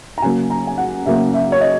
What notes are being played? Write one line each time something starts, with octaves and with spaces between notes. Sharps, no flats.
A#5
C#3 F#3 A#3 G#5
A#5
G#5
F#5
C#3 F#3 A#3 E5
E5
C#5
D#5